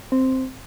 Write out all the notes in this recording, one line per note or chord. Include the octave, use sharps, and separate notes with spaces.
C4